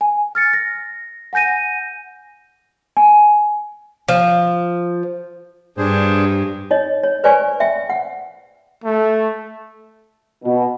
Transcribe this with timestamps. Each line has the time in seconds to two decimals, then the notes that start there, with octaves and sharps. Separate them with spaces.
0.01 G#5
0.35 F6 A6 C#7
0.53 A#6
1.33 F#5 G#5 G6 A#6 D#7
2.97 G#5
4.08 F3
5.78 G2 D4 G#4 C5
6.71 D#4 C#5 D#5
7.03 C#5
7.24 B4 C5 D5 G#5 C#6
7.60 E5 G5
7.90 F#5
8.84 A3
10.44 B2